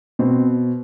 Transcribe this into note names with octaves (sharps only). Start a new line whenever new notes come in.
B2 C4